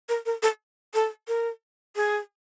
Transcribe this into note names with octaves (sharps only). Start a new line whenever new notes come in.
A#4
A#4
A4
A4
A#4
G#4